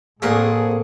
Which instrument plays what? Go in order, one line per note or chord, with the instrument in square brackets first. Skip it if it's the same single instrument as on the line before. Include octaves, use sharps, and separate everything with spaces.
[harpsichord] A#1 F#5 [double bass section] A2 C4 [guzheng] A3 A#3 A#4 [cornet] G#4